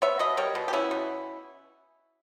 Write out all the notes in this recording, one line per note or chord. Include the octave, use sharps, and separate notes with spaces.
B3 C#5 E5
B2 B4 D#5
G3 A#4 C#5
B2
G4
B3 C#4 E4
B2